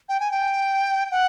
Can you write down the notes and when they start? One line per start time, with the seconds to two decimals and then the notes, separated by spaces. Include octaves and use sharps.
0.09 G5
0.20 G#5
0.31 G5
1.11 F#5